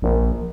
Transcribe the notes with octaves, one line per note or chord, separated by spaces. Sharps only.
A#1